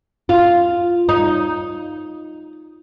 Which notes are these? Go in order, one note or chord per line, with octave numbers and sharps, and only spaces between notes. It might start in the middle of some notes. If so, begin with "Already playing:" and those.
F4
D#4